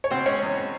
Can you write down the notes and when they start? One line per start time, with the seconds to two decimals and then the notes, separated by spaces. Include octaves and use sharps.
0.04 C#5
0.11 B2 C4 C5
0.26 G#3 C#4 C#5
0.42 E2